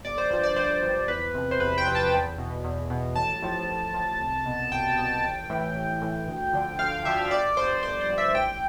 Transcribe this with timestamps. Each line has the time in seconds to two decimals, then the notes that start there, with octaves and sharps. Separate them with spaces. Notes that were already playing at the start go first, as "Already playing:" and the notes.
0.05 G1 D5
0.18 C5
0.30 G2 F3 C5
0.43 D5
0.56 G1 C5
0.83 G2 F3
1.08 E2 B4
1.34 C3 F3
1.51 C5
1.60 E2 B4
1.78 G5
1.86 C3 F3
1.95 A5
2.13 E2
2.38 B2
2.64 E2
2.90 B2
3.16 A1 A5
3.42 A2 F3
3.68 A1
3.94 A2 F3
4.20 C2
4.46 B2
4.72 C2 G5
4.98 B2
5.23 A1
5.50 A2 E3
5.75 A1
6.01 A2 E3
6.27 D2
6.53 D3 F3
6.79 D2 F5
7.05 D3 F3 E5
7.31 G1 D5
7.57 G2 F3 C5
7.83 G1 C5
8.01 C5
8.09 G2 F3
8.18 E5
8.35 A1 G5